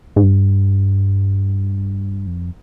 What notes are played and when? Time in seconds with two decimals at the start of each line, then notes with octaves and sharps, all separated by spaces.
0.16 G#2
0.23 G2
2.27 F2